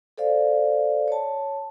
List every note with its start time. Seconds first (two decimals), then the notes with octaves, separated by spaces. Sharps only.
0.18 A4 C5 D5 F5
1.08 C#5 A5